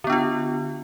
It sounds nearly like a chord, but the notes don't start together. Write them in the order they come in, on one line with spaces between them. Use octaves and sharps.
D3 B3 D4 F4